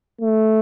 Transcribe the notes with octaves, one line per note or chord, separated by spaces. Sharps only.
A3